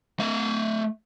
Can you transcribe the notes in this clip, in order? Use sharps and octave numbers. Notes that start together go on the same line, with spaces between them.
A3 F5